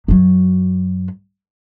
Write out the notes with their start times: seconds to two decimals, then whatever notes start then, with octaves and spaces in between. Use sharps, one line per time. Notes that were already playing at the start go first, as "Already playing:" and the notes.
0.08 F#2 F#3